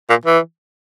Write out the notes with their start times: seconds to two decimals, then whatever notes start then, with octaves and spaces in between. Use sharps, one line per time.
0.09 A#2
0.25 E3